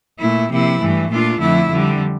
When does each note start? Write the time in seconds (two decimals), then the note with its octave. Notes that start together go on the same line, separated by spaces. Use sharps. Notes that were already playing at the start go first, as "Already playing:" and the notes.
0.19 A#2 A3 E4
0.50 C3 F3 A#3 E4
0.80 G2 E3 A3
1.10 A#2 A3 D4 F4
1.40 F2 D3 A3 E4
1.70 F2 D3 G3